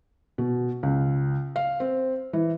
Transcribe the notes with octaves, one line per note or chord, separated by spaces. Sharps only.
B2
C#2
F5
C4
E3